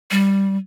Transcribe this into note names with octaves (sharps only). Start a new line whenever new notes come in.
G3